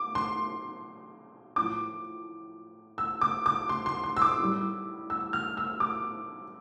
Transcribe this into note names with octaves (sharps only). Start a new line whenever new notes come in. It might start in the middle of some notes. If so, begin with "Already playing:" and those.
Already playing: D6
C6
A2 F3 D6
E6
D6
D6
C6
C6
C6
E6
D6
A2 G3
E6
F6
E6
D6